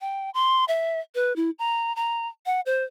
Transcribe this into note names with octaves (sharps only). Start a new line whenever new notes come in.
G5
C6
E5
B4
E4
A#5
A#5
F#5
C5